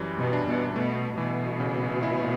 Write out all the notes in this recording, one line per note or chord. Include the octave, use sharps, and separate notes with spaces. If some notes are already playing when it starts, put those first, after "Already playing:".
Already playing: F#2 E3 G3
B2
D4
B2
B2 A3
B2 E3
C#3
E4